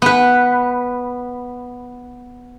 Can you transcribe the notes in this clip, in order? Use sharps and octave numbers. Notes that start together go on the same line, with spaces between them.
B3 B4